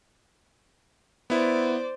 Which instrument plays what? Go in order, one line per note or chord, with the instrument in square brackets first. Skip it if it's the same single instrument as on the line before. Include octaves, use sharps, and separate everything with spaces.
[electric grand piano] B3 E4 [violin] C5 D5